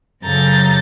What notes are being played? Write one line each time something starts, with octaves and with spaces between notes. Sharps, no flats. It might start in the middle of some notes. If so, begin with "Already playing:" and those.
F#2 C#3 A4 A#5 G6 A6